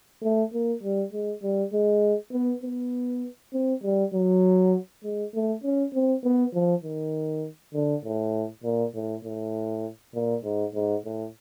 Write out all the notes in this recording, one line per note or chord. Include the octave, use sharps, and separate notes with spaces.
A3
A#3
G3
G#3
G3
G#3
B3
B3
C4
G3
F#3
G#3
A3
C#4
C4
B3
F3
D#3
D3
A2
A#2
A2
A2
A#2
G#2
G#2
A2